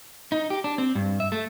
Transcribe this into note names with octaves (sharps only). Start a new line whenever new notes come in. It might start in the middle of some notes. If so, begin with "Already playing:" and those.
D#4
G4
D4
C4
G2
E5
A3